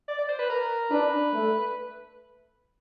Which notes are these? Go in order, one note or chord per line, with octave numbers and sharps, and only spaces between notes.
D5
D5
C5
B4
A#4
D4 B4
A3